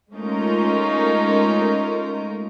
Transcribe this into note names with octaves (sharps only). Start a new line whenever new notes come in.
G#3 A3 C#4 D#4 F4 A#4